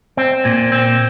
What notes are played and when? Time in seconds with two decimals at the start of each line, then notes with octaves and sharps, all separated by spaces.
0.17 C4
0.45 A#2
0.72 C4